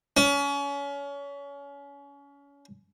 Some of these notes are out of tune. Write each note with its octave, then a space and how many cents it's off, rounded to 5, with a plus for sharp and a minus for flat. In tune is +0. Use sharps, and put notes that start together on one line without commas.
C#4 +30